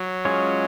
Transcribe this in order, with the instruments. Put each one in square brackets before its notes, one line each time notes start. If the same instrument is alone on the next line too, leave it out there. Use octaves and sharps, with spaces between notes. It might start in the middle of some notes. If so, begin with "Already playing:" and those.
Already playing: [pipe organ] F#3
[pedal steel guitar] G#3 C#4 F4 G#4 C#5